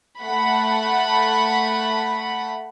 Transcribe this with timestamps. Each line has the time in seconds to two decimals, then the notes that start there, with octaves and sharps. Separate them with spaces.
0.22 A3 F#5 B5